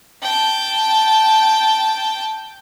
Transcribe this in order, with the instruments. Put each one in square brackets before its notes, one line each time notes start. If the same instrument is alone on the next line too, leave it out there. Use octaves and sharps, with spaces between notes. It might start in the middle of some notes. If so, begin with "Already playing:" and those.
[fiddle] G5 A5